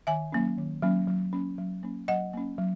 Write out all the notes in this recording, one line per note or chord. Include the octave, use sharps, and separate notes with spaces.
D#3 E5 G#5
F#3 A#3 C#4
D#3
F#3 A#3 C#4
F#3
A#3 C#4
F#3
A#3 C#4
F#3 D#5 F#5
A#3 C#4
F#3